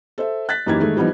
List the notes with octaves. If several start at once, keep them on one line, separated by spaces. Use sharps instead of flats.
A4 C5 E5
F#6 A6 B6
F#2 E3 A#3 D#4 G4 G#6
D#3 G#3 A3
E3 F3 G3 B3 D#4